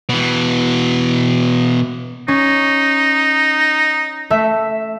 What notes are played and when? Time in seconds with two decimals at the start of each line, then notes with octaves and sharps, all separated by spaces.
0.09 B2 E3
2.28 C#4 D#4
4.30 A3 E5